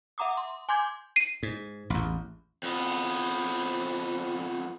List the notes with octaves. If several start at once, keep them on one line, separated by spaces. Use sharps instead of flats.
E5 F#5 A#5 D6 D#6
C6
G#5 C6 D6 G6 G#6
C7 D#7
G#2
A1 E2
F2 B3